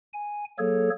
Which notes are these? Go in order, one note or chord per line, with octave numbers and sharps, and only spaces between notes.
G#5
F#3 A#3 G#4 A4 C#5